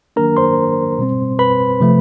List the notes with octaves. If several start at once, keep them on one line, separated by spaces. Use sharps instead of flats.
D#3 F#3 A#3 D4 A#4 A#5
C5 C6
B2 G3 C4
B4 B5
C3 F3 A3